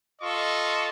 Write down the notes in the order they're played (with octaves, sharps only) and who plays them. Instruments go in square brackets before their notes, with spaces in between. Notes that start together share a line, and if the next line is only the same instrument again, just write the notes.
[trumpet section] F4 A4 D#5 C#6